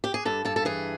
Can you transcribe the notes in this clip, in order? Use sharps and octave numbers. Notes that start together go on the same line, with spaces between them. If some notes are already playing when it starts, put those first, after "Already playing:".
G4
G#4
G2 A4
G2 A4
A4
E3 G#4